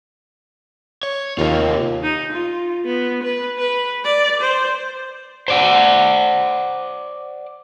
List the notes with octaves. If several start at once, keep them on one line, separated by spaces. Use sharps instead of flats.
C#5
D#2 C3 F4
D#4
F4
B3
B4
B4
D5
C5
C5 D5 F#5